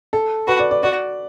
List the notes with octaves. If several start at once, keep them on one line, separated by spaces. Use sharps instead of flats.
A4
F#4 B4
D5
D5
F#4 D5